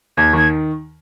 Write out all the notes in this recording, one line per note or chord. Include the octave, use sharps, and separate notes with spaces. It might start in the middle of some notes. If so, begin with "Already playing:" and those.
D#2 G#6
D#3 G#6